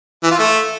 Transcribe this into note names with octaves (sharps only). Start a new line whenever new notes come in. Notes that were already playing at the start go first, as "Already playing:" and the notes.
E3
F4
A3